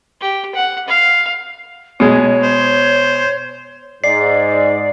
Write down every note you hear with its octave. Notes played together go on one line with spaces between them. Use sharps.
G4
F#5
F5
B2 G#3 C#5
C5
G#2 D5 C7